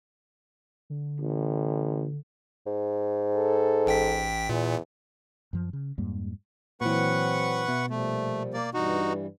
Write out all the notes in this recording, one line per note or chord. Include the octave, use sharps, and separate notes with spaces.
D3
A1
G#2
A4
A1 G5 B6
E2 A#2
F#2 F3
C#3
F2 G#2 G3 A#3
A#2 E3 F#3 C4 B4 F#5 C#6
B2 E5
A#2 F3 G3 A3
A#3 D5
G2 E3 G3 D#4 F#4